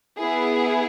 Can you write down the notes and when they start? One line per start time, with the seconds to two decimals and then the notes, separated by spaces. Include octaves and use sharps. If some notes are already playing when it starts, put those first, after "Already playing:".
0.19 B3 E4 G#4